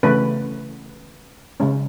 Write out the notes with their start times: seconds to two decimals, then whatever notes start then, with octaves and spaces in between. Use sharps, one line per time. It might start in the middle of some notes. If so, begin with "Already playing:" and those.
0.03 C#3 E3 A3 C#4 B4
1.60 C#3 G#3 C#4